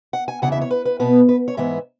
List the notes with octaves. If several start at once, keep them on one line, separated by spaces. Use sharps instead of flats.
F#5
G#5
E2 C#3 E3 F#5
E5
C#5
B4
B4
B2 B3 B4
B4
C#5
G#2 E3 B3 E5